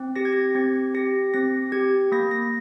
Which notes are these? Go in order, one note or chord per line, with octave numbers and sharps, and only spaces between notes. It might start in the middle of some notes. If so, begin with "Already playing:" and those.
Already playing: C4
G4 A#6
G#6
A#6
C4 G#6
G4 A#6
C4 A#6
G4 G#6
A#3 A#6
A#6